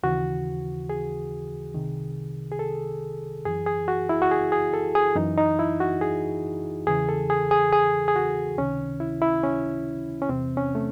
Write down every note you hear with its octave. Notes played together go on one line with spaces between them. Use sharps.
D#2 C#3 E3 F#4
G#4
C2 C3 D#3
G#4
A4
F#2 E3 G#4
G#4
F#4
E4
F#4
G#4
G#4
A4
G#4
F#2 E3 D#4
D#4
E4
F#4
G#4
E2 C#3 E3 G#4
A4
G#4
G#4
G#4
G#4
F#4
C#2 C3 D#3 C#4
E4
E4
C#4
C#4
E2 C3 E3 C4
C#4
A3